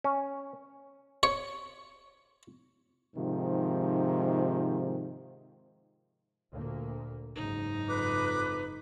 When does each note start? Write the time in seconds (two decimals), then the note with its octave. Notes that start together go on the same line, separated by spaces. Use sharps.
0.04 C#4
1.23 C#5
3.15 G#2 C3 D#3 F3
6.53 D2 A#2 A#3
7.36 F#1 G#2 D#4
7.88 F2 B4 D6